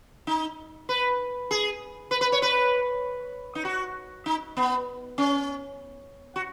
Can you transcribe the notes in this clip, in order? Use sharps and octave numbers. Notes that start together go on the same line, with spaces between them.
D#4
B4
G#4
B4
B4
C#5
B4
D#4
F#4
D#4
B3
C#4
F#4